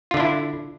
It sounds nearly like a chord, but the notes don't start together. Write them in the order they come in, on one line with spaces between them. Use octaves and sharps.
F4 D3 D4 E4